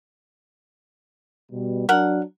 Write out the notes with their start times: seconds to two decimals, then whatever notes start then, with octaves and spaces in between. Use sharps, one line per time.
1.52 B2 G3
1.89 F#3 D4 A#4 F#5